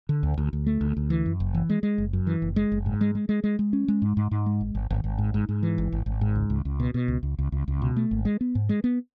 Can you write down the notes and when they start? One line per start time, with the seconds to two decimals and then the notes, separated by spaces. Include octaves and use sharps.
0.09 D3
0.23 D2
0.38 D2
0.53 D2
0.67 A3
0.81 D2
0.97 D2
1.10 E3
1.26 F#2
1.40 F#1
1.55 E3
1.70 G#3
1.83 G#3
1.98 F#1
2.13 F#2
2.27 E3
2.42 F#1
2.56 G#3
2.72 F#1
2.86 G#2
3.01 G#3
3.15 G#3
3.29 G#3
3.44 G#3
3.59 G#3
3.73 C#4
3.88 G#3
4.02 G#2
4.17 G#2
4.31 G#2
4.46 G#3
4.61 G#1
4.75 G#1
4.90 G#1
5.04 G#1
5.18 G#2
5.34 G#2
5.49 G#2
5.63 E3
5.78 G#1
5.92 G#1
6.06 G#1
6.21 G#2
6.35 C#2
6.50 C#2
6.65 C#2
6.80 B2
6.94 B2
7.08 C#2
7.23 C#2
7.39 C#2
7.52 C#2
7.68 C#2
7.82 B2
7.96 A3
8.11 G#1
8.25 G#3
8.41 B3
8.55 G#2
8.69 G#3
8.84 B3